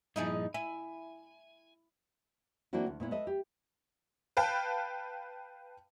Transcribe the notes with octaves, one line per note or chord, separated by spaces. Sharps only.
G2 A#2 F3 D#4 E4 G#4
E4 G#5
E3 A#3 C4 D4 E4 F#4
D2
A#2 B3 E4
A4 B4 D#5 E5
G4
B4 F5 G5 A5